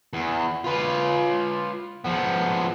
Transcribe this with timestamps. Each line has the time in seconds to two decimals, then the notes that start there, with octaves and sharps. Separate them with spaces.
0.13 E2
0.64 F4 B4
2.04 F3 B3